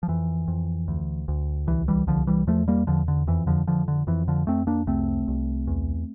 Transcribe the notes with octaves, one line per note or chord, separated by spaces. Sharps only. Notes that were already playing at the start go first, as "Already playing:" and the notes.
F3
F2 E3
F2
D2
D2
C2 E3
E3 G3
C2 D3 F3
E3 G3
E2 F3 A3
G3 A#3
E2 D3 F3
D3
F2 E3
D3 F3
F2 D3 F3
D3
F2 E3
D3 F3
F2 A3 C4
A#3 D4
C2 A3 C4
C2
E2